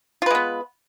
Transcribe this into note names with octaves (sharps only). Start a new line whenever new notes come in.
G#3 B3 F4 B4